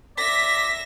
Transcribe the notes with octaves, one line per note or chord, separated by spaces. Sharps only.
D5 E5 A#6 B6